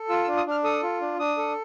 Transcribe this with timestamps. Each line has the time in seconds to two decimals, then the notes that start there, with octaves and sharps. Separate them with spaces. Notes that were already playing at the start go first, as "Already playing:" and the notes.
Already playing: A4
0.09 F4 E6
0.23 E6
0.28 D4
0.37 D#6
0.47 D4 F6
0.64 A4 D#6
0.83 F4
1.01 D4
1.19 D4 D#6
1.37 A4